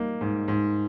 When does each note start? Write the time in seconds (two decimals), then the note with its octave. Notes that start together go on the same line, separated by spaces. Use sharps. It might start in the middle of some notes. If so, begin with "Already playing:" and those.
Already playing: G3 A#3 D#4
0.21 G#2
0.48 G#2